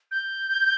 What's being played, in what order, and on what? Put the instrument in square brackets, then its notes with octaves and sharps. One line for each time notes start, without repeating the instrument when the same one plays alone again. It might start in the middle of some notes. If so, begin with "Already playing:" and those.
[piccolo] G6